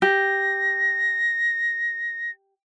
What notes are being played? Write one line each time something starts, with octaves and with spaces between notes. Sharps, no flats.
G4 A#6